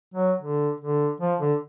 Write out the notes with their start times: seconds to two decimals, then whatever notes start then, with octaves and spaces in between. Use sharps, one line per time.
0.14 F#3
0.42 D3
0.81 D3
1.21 F3
1.40 D3